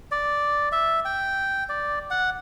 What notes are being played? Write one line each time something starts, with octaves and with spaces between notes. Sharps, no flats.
D5
E5
G5
D5
F#5